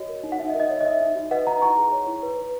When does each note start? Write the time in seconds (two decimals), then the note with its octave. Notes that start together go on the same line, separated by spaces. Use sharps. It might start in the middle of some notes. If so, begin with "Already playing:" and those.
Already playing: F#4 C#5 D#5
0.09 A#4
0.23 D#4
0.32 F#5
0.39 D#4 E5
0.50 D#5
0.55 A#4
0.60 D#5
0.69 C#5 E5
0.81 D#5
0.85 D#4 E5
1.00 D#4
1.15 F#4
1.31 B4 D#5 F#5
1.47 D#4 F#5 A#5
1.62 E4 A#5 C#6
1.77 G#4
1.92 C#5
2.07 E4
2.23 B4
2.39 B4